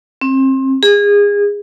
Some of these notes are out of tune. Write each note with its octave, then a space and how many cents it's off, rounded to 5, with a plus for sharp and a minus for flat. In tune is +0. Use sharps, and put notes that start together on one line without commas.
C4 +30
G#4 -25